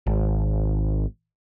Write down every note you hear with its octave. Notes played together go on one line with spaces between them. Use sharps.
G#1